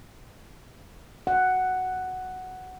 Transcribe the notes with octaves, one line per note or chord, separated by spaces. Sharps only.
F#5